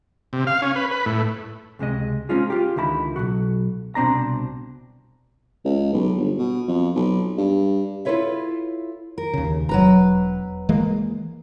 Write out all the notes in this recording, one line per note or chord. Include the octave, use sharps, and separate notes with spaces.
C3
F5
C#4
B4
B4
A2
C#2 C3 G#3 D#5
G#3 C4 C#4 D#4 F4 G#4
F4 G4
C#2 D3 D#3 E4 A#5 B5
B1 F#3 F#4
C2 B2 C4 D4 A#5
C#2
B1
G1
B2
F2
B1
G2
E4 F4 A4 B4 C#5 E5
A#4
D#2 C#3
E1 F#3 B4 A#5
E3 G#3 A#3